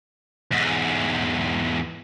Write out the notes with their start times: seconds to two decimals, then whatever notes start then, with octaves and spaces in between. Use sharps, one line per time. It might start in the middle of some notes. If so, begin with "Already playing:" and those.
0.51 E2 G#2